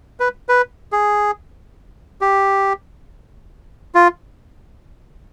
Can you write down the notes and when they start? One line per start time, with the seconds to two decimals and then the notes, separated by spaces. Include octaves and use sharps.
0.20 B4
0.49 B4
0.92 G#4
2.21 G4
3.95 F4